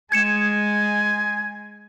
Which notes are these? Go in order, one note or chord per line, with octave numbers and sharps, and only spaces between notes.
G#3 G#5 G#6 C#7 E7